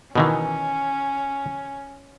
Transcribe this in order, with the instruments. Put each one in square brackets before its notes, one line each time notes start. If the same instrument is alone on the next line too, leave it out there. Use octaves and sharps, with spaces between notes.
[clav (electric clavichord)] B2 D#3 E3 [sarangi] C#4